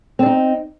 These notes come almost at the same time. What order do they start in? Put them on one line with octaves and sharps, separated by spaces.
C4 D4 D#4